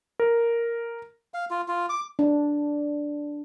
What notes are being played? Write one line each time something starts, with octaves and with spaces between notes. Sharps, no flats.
A#4
F5
F4
F4
D6
D4